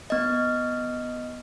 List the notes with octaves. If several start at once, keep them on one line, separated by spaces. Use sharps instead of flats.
B3 D#5